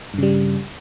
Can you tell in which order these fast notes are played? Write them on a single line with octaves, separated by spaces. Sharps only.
G2 C#3 G3